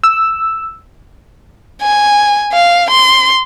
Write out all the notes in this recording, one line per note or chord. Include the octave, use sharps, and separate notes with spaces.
E6
G#5
F5
C6